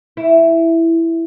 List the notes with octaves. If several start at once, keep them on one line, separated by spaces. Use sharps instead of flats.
E4